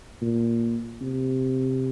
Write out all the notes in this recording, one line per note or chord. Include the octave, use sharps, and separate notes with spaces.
A#2
C3